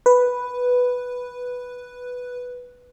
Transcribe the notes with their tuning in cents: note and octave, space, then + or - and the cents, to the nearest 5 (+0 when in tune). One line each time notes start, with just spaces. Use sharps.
B4 +0